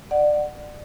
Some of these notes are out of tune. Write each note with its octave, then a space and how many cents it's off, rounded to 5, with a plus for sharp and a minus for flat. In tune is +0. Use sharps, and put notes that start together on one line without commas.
D5 +25 F#5 +5